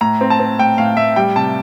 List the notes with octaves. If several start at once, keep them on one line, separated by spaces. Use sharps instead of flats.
A2 A#5
C4
A5
C4
A2 G5
A2 F5
A2 E5
G3 G5
C3 A5